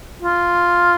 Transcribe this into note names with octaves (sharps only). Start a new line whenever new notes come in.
F4